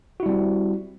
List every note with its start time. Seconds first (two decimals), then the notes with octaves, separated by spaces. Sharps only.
0.20 F#4
0.23 E4
0.26 G3
0.29 C4